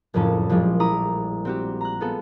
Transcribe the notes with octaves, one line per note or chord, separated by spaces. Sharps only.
F#1 F2 A2 F3 C#4 A5
A#1 F3 G3 G#3 F4
E4 D5 A#5 D#6
C4 F#4 G4
A#5 F#6
B3 F4 G#4 A4